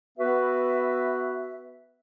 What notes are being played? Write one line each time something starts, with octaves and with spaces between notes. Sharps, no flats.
B3 F#4 B4 E5